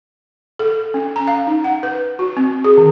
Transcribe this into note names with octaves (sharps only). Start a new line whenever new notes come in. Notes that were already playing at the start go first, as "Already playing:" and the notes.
A4
C#4
A#5
F5
D#4
F#5
B4
F#4
C4
G#4
D#3